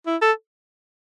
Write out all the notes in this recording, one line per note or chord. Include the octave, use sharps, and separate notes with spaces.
E4
A4